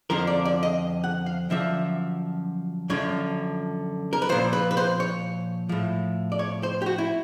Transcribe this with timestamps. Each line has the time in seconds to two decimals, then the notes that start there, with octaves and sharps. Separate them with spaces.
0.10 F2 D3 F3 A#4
0.27 D5
0.45 D5
0.63 D#5
1.04 F#5
1.26 F5
1.50 F#2 D3 F3 E5
2.90 F#2 D3 F3 C#5
4.13 A#4
4.22 B4
4.29 A#2 F3 C5
4.53 B4
4.71 B4
4.77 C5
5.00 C#5
5.69 A2 F3
6.32 D5
6.39 C#5
6.63 C5
6.82 G4
6.86 F#4
6.98 E4